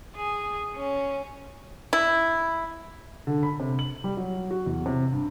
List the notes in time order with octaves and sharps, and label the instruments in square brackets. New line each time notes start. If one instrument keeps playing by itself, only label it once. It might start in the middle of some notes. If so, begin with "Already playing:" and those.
[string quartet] G#4
C#4
[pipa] E4
[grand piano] D3
B5
C3
F#7
G3
F#3
F#4
E2
C3
G2